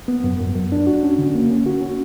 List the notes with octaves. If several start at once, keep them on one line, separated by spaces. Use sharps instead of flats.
B3
F#2
F#2
F#2
D4
F#4
C#4
D3
A#3
C#4
F#4
C#4